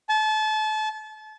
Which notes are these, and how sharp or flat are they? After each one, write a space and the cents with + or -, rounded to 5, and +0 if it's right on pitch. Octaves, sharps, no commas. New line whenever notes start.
A5 -30